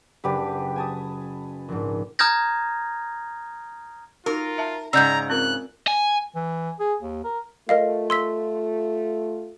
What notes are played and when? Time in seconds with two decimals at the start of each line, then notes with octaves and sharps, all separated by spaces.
0.24 F#1 D4 G4 B4
0.76 G#5 A5 D#6
1.68 A#1 G#2
2.19 A#5 D#6 F6 G6 G#6 A#6
4.26 D#4 F4 F#4 A#4
4.58 E5 A5
4.93 G#2 C#3 D5 D#5 F#5 A#5 E6 G6
5.30 C4 F4 A#4 F#6
5.88 G#5
6.35 E3
6.80 G#4
7.01 D#2
7.24 A#4
7.69 A3 F4 A#4 D#5 F5
8.10 C6 E6 B6